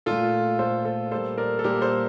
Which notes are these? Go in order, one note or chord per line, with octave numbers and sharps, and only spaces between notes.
A#2 A3 F4 A4
A#2 A3 A4 C5
A4 C5
A#2 G3 A#3 A4 C5
A#4 D5
A4
A#2 G3 A#3 G4 A#4
A4 C5